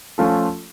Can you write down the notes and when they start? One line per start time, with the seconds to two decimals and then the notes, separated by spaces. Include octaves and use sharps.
0.18 F3 A3 C#4 F4 A4